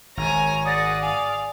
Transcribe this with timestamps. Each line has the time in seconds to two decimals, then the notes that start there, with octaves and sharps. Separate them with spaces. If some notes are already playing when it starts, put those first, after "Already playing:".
0.17 G#1 C#5 G#5 A#5
0.65 G#4 D5 F#5 D#6 A6 A#6
1.03 F5 G#5 D#6